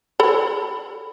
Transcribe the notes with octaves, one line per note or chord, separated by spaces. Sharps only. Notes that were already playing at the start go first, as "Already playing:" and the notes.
A4 B5